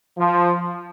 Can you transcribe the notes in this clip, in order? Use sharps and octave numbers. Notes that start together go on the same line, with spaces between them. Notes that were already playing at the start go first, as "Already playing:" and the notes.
F3